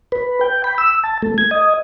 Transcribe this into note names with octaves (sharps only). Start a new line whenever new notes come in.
B4
G5
B5
E6
A5
A3
G#6
D#5